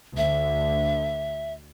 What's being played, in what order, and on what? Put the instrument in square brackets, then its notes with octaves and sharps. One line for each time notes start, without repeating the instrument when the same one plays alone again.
[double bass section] D2 D3 [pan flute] E5